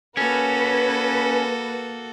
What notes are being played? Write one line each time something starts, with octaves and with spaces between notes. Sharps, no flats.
A#3 C#4 F#4 A4 B4